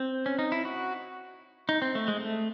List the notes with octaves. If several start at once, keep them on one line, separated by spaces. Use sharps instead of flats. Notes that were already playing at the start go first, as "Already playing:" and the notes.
Already playing: C4
C#4
D#4
E4
F#4
D#4
C4
A3
G#3
A3